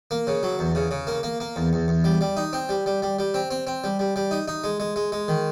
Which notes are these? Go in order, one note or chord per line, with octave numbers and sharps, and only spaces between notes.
A#3
C#3
F#3
E2
C#3
C#3
A#3
A#3
A#3
E2
E2
E2
G3
G3
D#4
C4
G3
G3
G3
G3
C4
C4
C4
G3
G3
G3
D#4
D#4
G#3
G#3
G#3
G#3
D#3